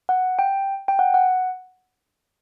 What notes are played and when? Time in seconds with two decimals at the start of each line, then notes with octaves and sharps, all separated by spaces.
0.09 F#5
0.39 G5
0.88 G5
0.99 F#5
1.14 F#5